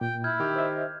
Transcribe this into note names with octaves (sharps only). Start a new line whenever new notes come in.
A#2 G5
E4 F6 G6 G#6
D#3 G4
C5 D#5 E5